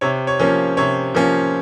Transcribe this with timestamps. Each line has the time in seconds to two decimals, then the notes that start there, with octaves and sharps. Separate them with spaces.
0.01 C3 C#5
0.27 C#5
0.39 F3 A#3 C#4
0.77 C3 C#5
1.15 F3 A#3 C#4